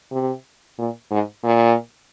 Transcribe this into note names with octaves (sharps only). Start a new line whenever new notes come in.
C3
A#2
G#2
A#2